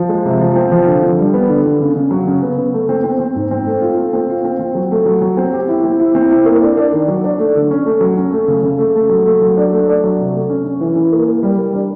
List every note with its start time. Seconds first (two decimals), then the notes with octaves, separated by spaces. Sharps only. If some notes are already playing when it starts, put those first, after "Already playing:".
Already playing: F3
0.09 G#3
0.25 C3
0.41 F3
0.56 C4
0.71 F3
0.87 D3
1.02 D3
1.19 G3
1.34 B3
1.49 D3
1.65 D3
1.80 C#3
1.96 C#3
2.11 F#3
2.27 C#3
2.43 B3
2.58 B3
2.74 A3
2.89 C4
3.04 C4
3.20 C4
3.36 G#2
3.51 C4
3.66 A3
3.82 F4
3.97 A3
4.13 C4
4.29 F4
4.44 C4
4.59 C4
4.75 F#3
4.91 A3
5.06 F#3
5.22 F#3
5.37 C4
5.53 G4
5.68 E4
5.84 C4
6.00 E4
6.15 C4
6.30 E4
6.46 A#3
6.62 D4
6.77 D4
6.92 D#3
7.08 F#3
7.24 D4
7.39 A3
7.55 D3
7.71 C#4
7.86 A3
8.01 F#3
8.17 C#4
8.32 A3
8.48 C#3
8.63 C#3
8.79 A3
8.95 A3
9.09 F#3
9.25 A3
9.41 F#3
9.57 D4
9.72 A3
9.88 D4
10.04 F#3
10.19 C3
10.34 A3
10.50 C#4
10.65 C#4
10.81 E3
10.96 E3
11.12 A#3
11.28 A#3
11.43 G3
11.58 G3
11.74 D4